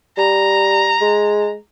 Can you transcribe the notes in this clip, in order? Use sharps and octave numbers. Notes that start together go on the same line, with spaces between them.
G3 A#5
G#3